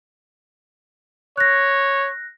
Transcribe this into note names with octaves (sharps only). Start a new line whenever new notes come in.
C#5 F#6 A#6